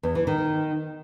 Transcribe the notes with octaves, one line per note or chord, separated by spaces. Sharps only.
E2
E3
D#3